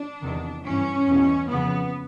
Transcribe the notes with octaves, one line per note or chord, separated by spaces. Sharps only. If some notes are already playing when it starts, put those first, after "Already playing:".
Already playing: D4
E2 C3 D#3
G2 E3 C#4
E2 B2
F2 C#3 F3 B3